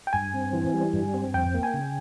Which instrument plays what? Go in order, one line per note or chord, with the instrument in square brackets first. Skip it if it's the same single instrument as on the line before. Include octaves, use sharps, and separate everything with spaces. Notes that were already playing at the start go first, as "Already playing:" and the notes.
[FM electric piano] G5
[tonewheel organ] G2 [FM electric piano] G#5
[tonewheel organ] C4
E3
G3
G2
C4
[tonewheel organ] F2 [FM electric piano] G5
[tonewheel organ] A#3
[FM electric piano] G#5
[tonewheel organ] C#3